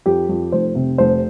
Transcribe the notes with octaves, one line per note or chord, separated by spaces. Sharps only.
F2 G4
F2
F1 C5
C3
F1 C5